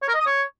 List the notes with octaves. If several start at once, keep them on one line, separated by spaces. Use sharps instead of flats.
C#5
A#4
D#5
D#6
C#5